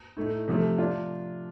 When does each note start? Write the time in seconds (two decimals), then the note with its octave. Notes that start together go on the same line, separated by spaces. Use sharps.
0.17 A2 A3 D#4
0.48 C3 F3 A3
0.78 D4 F4